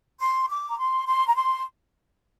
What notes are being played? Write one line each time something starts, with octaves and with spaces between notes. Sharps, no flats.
C6
D6
A#5
C6
C6
A#5
C6